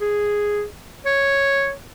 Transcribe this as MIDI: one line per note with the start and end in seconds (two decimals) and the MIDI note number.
0.01 0.64 68
1.06 1.72 73